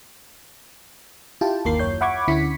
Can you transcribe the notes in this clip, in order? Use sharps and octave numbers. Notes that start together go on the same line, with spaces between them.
E4 F4 G4 G5 A5
G1 D#2 D#3 A#3 A#4 C7
F#2 C#5 G6
E5 F#5 B5 C#6 D6 G#6
D2 D3 C#4 E4 B6 C#7